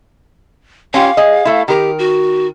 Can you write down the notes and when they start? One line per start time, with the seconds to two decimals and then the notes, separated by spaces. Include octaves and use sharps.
0.94 C#4 F4 G4 F5
1.17 G#4 D#5
1.45 A3 E4
1.68 D#3 G4 A#4
1.99 F#4